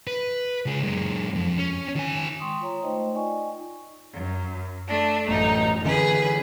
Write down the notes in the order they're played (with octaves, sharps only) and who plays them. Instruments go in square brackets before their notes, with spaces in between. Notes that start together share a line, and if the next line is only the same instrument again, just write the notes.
[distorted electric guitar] B4
C#2 G#4
F#2 G#3
F2
C#4
D#3 G#5
[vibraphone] G#3 G5 C6 C#6 D#6
F4 C#5 A#5
A3 D#4 C5 D#5 G5
D#4 F4 D5 D#5 G#5 C#6
[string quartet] F#2
A3 D4
[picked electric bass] A1 F#2 A3 [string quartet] D#4
[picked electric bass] D3 E3 C#4 [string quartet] G#4 B4